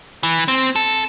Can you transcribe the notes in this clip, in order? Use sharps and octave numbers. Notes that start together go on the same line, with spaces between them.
E3
C4
A4